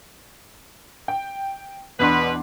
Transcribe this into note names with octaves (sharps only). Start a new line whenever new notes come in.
G5
E2 B2 D4 B4 C6